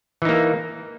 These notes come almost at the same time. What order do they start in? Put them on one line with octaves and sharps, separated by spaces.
E3 D#4 A#3